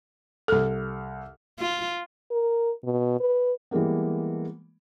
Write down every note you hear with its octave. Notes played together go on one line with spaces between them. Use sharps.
C2 A4 F6
F4
A#4
B2
B4
E3 G3 G#3 A#3 B3